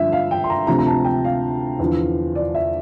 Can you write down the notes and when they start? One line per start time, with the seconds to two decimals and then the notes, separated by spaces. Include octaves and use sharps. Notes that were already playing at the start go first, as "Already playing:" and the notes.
Already playing: G2 D3 F3 E5
0.12 F5
0.31 G5
0.44 C6
0.50 A#5
0.67 D2 C3 F3 A#5
0.79 A#5
0.86 A5
1.05 G5
1.24 F5
1.79 E2 D3 F3
2.35 D5
2.55 E5